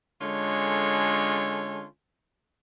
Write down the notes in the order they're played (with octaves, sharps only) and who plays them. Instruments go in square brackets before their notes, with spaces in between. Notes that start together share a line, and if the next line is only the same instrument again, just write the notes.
[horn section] D3 G#3 C#4 F4 A4 C#5